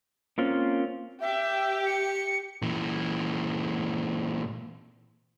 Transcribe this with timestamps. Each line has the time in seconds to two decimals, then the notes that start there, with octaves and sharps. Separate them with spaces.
0.38 A#3 C4 C#4 F4
1.21 G4 E5
1.86 C#7
2.62 A#2 E3